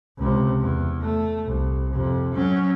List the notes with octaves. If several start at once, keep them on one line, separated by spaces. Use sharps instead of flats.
C#2 C3
E2
A3
C2
F2 C3
F#3 C#4